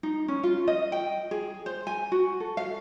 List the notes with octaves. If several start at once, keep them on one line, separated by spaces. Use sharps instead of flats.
D#4
C#4
F4
D#5
G5
G#4
C5
G#5
F#4
A4
F5